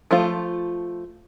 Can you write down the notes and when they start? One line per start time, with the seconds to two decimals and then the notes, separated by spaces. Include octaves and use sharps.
0.11 F3 A3 F4